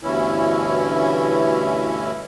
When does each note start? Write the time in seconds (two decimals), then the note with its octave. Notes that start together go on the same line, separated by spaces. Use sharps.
0.03 D2 G2 B2 E3 C#4 E4